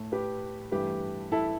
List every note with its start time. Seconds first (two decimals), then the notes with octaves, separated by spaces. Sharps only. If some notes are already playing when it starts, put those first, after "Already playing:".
Already playing: A2 A3
0.12 G4 B4
0.72 G2 E3 A3 G4 B4
1.32 E4 A4